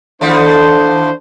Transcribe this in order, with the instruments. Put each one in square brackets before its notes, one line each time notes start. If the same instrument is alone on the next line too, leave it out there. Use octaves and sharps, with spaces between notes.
[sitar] D#2 F3 A3 [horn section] D4 C5